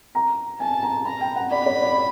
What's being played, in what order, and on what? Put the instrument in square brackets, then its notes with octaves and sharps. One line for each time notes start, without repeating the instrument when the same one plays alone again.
[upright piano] A#5
[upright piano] G#5 [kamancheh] A5
[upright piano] A#5
[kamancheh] A#5 [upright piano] B5
[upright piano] G5
F#5
[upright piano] D5 [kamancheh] B5
[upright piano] C#5
D5